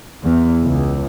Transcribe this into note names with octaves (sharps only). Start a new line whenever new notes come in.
E2
C#2